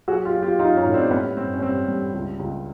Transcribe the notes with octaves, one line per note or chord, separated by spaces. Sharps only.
F#3 F#4 G#4
F4 G4
F#3
F4 G4
F#3 D#4 F4
C#4 D#4
A2
C4 D4
G3 B3 C#4
G2 C4
C#4
G2 C4
G2
C#2
C#2